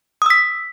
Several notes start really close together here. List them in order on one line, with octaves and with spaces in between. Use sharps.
D#6 E6 B6